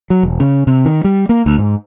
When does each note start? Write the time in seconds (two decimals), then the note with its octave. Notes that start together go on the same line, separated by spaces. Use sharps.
0.10 F#3
0.23 E1
0.40 C#3
0.67 C3
0.85 D#3
1.04 G3
1.29 A#3
1.46 D2
1.58 G#2